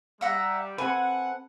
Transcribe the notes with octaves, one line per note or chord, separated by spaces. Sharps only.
G3 E5 F#5 A#5
C4 A4 B4 F#5 G#5